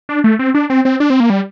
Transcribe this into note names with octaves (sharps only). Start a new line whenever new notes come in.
D4
A3
C4
D4
C4
C4
D4
C4
A#3
G3